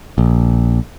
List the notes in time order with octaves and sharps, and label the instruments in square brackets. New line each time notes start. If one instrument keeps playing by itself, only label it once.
[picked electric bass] A#1